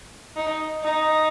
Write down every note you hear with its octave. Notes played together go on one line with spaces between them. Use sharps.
D#4
D#4